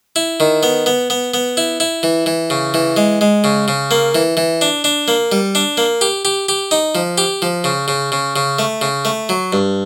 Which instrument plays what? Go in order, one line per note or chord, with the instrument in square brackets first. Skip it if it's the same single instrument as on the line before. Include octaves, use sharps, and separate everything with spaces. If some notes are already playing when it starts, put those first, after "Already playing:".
[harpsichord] E4
D#3
B3
B3
B3
B3
E4
E4
E3
E3
C#3
E3
G#3
G#3
C#3
C#3
A#3
E3
E3
D4
D4
A#3
G3
D4
A#3
G4
G4
G4
D#4
F3
G4
F3
C#3
C#3
C#3
C#3
A3
C#3
A3
F#3
G2